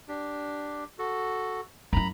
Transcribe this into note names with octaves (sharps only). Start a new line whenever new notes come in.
D4 G4
F#4 A4
F#2 E4 A#5 B5